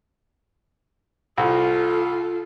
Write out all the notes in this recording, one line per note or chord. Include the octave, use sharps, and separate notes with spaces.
C2 F4 A4